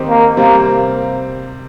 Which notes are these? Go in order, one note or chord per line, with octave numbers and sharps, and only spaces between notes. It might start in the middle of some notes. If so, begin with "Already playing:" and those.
Already playing: D#3 C4 D#4 G4
A#3
C3 G3 A#3 C4